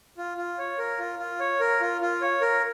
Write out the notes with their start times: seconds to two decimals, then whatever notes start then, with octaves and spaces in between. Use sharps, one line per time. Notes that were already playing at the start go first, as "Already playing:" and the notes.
0.17 F4
0.38 F4
0.58 C#5
0.78 A#4
0.99 F4
1.19 F4
1.40 C#5
1.60 A#4
1.81 F4
2.01 F4
2.21 C#5
2.41 A#4